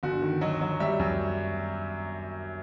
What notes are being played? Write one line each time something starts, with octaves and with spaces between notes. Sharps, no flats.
G1 F#4
D#3
F#3 D#5
F#3
G3 E5
F#2